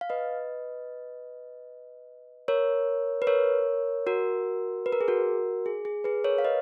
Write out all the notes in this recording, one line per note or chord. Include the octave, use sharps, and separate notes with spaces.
F5
B4 D#5
A#4 C#5
B4
A#4 C#5
F#4 A#4
B4
A#4
G#4
F#4 A#4
G#4
G#4
G#4 B4
A#4 C#5
F5
B4 D#5